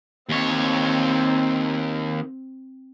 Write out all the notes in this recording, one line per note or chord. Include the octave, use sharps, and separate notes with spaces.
D#2 C4 C#5